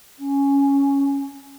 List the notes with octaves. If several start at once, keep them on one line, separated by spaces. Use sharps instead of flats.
C#4